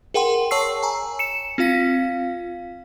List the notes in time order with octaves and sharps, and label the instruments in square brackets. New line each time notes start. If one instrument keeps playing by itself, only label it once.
[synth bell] G#4 A#4 F#5 G5 C6
C#5 A5 C#6 E6 C7
G#5 A#5
C#7 E7
C4 F4 F5 B6